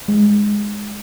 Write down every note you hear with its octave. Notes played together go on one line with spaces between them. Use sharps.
G#3